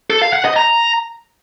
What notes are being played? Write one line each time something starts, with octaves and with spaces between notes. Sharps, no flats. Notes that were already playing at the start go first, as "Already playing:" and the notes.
A4
F5
F#5
D#5
A#5